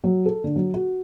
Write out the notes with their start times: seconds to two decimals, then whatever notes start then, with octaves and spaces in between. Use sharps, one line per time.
0.04 F#3
0.26 A4
0.44 D3
0.56 F#3
0.74 F#4